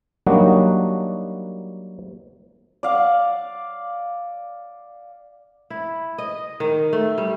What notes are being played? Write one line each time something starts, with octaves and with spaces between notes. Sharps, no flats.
F#3 G3 A#3 D4 D#4 F#4
D5 F5 F#5
E4
D#5
D#3
A3
G3